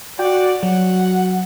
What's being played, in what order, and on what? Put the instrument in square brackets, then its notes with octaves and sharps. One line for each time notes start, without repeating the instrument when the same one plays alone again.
[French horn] F#4 [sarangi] D5 [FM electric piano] G5
[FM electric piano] F#3 [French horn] F#4 [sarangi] F#5